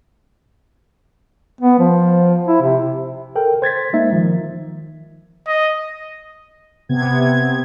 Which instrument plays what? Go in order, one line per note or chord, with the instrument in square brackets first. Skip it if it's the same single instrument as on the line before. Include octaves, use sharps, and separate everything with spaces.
[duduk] B3
F3
E4
C3
[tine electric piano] A4 A#4 G5
C5 G#6 A6 B6
G#3 A#3 D#4 E5
D#3 F3
[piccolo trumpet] D#5
[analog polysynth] C3 B3 G#6